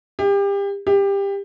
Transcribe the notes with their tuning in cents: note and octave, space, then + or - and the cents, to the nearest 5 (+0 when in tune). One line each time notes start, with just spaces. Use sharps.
G4 +30
G4 +20